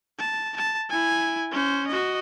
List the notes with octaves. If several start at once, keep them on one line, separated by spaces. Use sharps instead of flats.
A5
A5
E4 G#5
C#4 C5
F#4 D#5